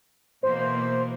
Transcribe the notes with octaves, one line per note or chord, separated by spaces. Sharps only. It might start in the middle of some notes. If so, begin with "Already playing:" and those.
B2 E3 A#3 C5